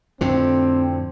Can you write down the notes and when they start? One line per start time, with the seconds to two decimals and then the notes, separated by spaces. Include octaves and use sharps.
0.21 F2 A2 D3 C4